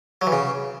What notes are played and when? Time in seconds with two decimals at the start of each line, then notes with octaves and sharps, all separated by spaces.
0.22 F#3
0.27 E3
0.32 C#3